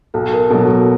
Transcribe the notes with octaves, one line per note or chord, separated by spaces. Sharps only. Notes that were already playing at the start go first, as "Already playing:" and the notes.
B1 A4
A#4
B2 F#3 A4
A4